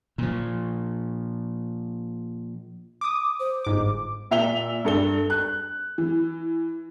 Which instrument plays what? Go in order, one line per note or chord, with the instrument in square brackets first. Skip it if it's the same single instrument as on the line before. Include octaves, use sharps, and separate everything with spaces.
[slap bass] A#2 F3
[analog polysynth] D6 D#6
[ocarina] C5
[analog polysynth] G1 G#2 D6
[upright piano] A#2 E5 F7 G7
G2 A4 G7
F#6
E3